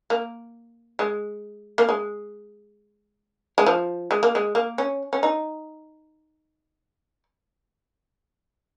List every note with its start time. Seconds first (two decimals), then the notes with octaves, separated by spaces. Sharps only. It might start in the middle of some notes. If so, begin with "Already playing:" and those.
0.10 A#3
0.99 G#3
1.78 A#3
1.89 G#3
3.58 G#3
3.66 F3
4.11 G#3
4.23 A#3
4.35 G#3
4.55 A#3
4.78 C#4
5.13 C#4
5.23 D#4